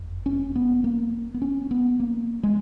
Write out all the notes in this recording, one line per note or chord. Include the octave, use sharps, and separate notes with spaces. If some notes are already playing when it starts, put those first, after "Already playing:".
Already playing: F#1 F2
C#4
B3
A#3
B3
C#4
B3
A#3
G#3